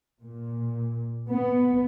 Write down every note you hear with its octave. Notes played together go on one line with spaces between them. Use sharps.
A#2
B3